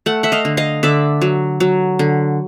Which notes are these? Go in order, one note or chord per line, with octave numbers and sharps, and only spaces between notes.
A3 F#5
E5 F#5
D#5 F5
D3
D#5 F5
D3 D5 E5
F#3
F#3
D3